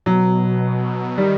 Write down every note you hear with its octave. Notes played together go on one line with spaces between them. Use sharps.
B2 F#3
D#3 G3